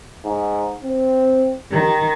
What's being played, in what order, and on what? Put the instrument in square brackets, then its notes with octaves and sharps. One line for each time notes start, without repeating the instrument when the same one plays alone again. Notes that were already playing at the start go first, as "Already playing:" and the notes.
[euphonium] G#2
C4
[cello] D#3 [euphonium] G4